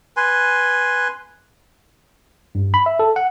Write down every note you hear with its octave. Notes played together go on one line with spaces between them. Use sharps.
B4 G#5 C6
G2
B5
E5
A4
F#5